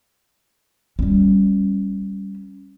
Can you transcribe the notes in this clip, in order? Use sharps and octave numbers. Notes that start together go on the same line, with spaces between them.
G3 C#4